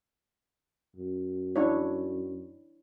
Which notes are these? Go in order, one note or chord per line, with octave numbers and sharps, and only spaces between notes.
F#2
D4 E4 C#5